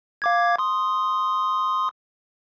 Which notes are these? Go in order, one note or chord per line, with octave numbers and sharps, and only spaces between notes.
F5 D6 G#6
C6 D#6